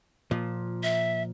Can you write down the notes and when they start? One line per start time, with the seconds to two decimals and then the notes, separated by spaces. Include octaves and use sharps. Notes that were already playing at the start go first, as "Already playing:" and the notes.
0.31 A#2 F3
0.83 E5